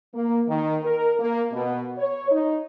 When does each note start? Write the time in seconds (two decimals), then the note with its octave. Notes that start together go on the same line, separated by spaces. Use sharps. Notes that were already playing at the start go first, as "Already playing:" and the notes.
0.14 A#3
0.48 D#3
0.83 A#4
1.19 A#3
1.53 B2
1.98 C#5
2.30 D#4